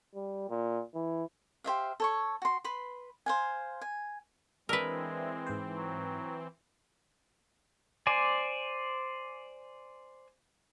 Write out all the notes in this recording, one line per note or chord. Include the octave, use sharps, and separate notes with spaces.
G3
A#2
E3
G4 C5 E5 F5
A4 C#5 C#6
F#4 C6
B4 B5 C6
C5 F5 G#5
G#5
E3 G#3 C4 D4 A#4 B4 E5
G#2 C5
F#3
C5 D5 G#5